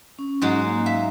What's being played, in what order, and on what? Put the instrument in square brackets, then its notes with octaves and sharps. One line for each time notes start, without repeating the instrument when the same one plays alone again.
[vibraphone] C#4
[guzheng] G#2 F#3 G#3
[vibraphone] A#3
[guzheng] E5 [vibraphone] F5